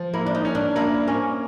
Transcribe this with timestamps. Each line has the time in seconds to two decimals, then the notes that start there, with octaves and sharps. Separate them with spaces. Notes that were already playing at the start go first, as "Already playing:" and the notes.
Already playing: F3
0.14 A#3 E4
0.26 D4
0.35 D#4
0.45 C#4
0.55 D4
0.76 A#3 E4
1.07 A#3 C#4